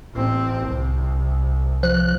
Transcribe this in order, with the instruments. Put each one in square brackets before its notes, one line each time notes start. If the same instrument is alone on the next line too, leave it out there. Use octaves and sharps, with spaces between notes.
[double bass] A1 C4
C2
[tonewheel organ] F3 F#6